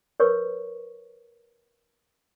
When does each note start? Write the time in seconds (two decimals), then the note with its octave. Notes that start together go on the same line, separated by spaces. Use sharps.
0.20 A#4 B4 C#5 C#6